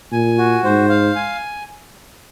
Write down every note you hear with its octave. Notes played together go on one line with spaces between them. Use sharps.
A#2 G#5
F#4
G#2 C5
F5
G#5